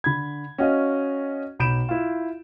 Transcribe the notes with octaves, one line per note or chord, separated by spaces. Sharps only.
D3 B5 G#6
C#4 F#4 D#5 F5 F#5
B1 B5 G6 D7 E7
E4 F4